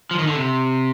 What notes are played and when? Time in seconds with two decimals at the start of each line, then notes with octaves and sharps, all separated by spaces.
0.11 F3
0.19 D#3
0.27 D3
0.35 C3